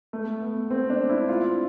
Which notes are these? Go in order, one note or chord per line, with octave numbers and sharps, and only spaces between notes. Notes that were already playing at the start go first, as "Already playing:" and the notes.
A3
B3
C4
D4
E4
F4